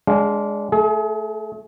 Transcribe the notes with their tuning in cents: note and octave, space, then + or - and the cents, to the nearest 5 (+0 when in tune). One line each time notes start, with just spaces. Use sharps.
G#3 +0 D4 -25 F5 +10
A3 +0 G#4 +35